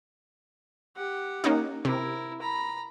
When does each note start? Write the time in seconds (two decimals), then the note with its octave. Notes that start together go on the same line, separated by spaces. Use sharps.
0.96 G4 F#5
1.44 A#3 C#4 D#4
1.85 C3 E4 A#4
2.41 A#5 B5